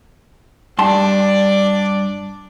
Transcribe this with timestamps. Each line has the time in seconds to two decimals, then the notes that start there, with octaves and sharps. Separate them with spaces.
0.79 G2 D4 D5 A5 C6